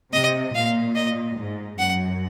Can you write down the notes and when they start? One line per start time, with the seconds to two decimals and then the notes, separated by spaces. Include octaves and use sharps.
0.13 C3 D#5
0.55 A#2 F5
0.96 D#5
1.37 G#2
1.78 F#2 F#5